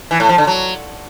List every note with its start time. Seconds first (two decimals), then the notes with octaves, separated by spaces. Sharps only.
0.11 E3
0.20 A2
0.29 F3
0.38 D3
0.47 F#3